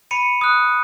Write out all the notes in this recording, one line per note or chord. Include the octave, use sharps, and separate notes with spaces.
B5 C#7 D#7
D#6 F#6